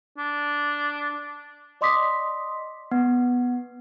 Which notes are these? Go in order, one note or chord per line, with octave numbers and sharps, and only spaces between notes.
D4
D5 D#5 C6 D6 D#6 B6
B3